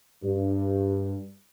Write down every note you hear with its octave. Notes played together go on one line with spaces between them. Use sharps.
G2